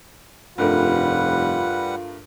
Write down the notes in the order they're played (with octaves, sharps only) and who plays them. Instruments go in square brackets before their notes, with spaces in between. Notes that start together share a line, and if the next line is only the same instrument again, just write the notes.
[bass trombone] F1 [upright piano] G2 A3 A#4 [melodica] G3 B4 F#5 [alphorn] F4